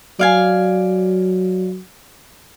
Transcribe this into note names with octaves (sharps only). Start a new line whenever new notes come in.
F#3 D5 F5 G#5